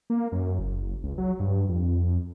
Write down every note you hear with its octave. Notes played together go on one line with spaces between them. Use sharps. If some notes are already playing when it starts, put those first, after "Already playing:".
A#3
F#2
F#1
C#2
F#3
G2
F2